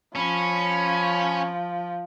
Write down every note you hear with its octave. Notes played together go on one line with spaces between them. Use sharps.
F3 C#4 B5